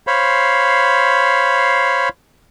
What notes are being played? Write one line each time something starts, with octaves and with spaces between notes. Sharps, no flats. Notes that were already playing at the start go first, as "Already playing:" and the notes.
C5 C#5 F5 B5